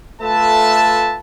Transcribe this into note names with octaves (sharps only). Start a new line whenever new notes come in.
A3 F4 A4 B4 E5 A5